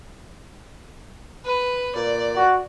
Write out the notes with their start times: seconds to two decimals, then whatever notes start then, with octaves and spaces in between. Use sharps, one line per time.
1.45 B4
1.95 A#2 D5
2.36 F#4